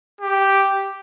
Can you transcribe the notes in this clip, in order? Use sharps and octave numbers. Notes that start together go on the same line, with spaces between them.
G4